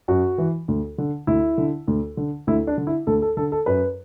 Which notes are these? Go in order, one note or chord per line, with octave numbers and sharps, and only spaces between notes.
F#2 F#4
E3
D2
D3
D2 E4
D3
D2
D3
D2 E4
D4
D3
E4
D2 A4
A4
D3 A4
A4
F#2 B4